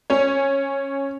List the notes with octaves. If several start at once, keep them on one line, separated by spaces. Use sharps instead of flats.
C#4 C#5